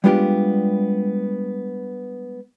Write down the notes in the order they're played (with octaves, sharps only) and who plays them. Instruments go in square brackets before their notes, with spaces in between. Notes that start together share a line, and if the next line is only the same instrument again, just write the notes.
[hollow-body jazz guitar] G3 G#3 B3 D4 F4 G4